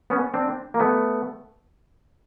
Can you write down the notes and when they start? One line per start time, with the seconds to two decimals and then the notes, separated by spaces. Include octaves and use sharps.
0.10 B3 C#4
0.34 C4 D4
0.74 A#3
0.80 A3 B3